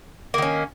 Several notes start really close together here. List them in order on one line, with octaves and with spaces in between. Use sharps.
A#3 D#3 C#4